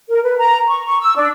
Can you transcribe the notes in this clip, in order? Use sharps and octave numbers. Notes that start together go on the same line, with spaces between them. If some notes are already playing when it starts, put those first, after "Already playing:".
A#4
B4
A#5
C#6
C#6
E6
D4